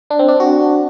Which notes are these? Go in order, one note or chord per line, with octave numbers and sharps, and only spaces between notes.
D4
C4
D4
F#4